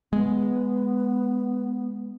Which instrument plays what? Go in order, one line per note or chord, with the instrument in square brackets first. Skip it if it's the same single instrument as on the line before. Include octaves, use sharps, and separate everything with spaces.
[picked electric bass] G#3 [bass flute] B3